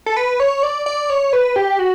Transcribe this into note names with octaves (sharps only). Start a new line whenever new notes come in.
A4
B4
C#5
D5
D5
C#5
B4
G4
F#4